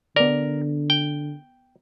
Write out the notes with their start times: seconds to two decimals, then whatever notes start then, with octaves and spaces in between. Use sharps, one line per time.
0.16 D3 B3 A#4 D5
0.90 G5